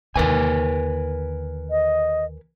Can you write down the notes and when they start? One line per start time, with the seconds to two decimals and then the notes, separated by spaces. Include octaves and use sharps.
0.16 D#2 D3 A#4 B4 G#5
1.70 D#5